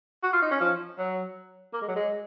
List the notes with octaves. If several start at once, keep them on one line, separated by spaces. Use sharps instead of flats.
F#4
F4
D#4
C#4
F3
F#3
A#3
G#3
F#3
G#3